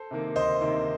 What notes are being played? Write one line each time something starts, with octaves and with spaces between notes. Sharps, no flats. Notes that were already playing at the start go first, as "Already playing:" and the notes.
Already playing: A4 C5
C3 D#3 A#3
D2 C5 D#5
C3 D#3 A#3